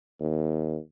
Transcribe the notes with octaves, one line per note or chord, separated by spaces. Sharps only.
D#2